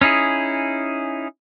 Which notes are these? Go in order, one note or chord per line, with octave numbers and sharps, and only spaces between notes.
C#4 D#4 E4 G#4